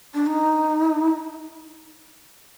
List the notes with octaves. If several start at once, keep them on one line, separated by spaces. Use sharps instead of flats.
D4
D#4